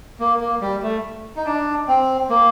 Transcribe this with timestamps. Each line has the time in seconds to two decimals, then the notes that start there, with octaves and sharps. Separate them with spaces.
0.20 A#3
0.40 A#3
0.61 G3
0.83 A3
1.36 D#4
1.45 D4
1.88 C4
2.30 A#3